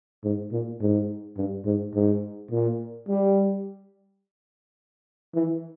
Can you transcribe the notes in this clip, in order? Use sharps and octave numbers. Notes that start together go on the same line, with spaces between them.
G#2
A#2
G#2
G2
G#2
G#2
A#2
G3
E3